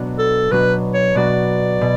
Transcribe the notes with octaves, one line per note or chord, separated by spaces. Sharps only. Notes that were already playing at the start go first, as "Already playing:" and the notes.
Already playing: B2 F#3 B3 D4 F#4
A4
B2 F#3 B3 D4 F#4 B4
C#5
B2 F#3 B3 D4 F#4 D5
B2